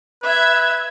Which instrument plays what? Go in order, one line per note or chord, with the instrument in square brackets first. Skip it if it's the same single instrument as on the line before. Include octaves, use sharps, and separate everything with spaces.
[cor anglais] B4 [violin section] E5 G#6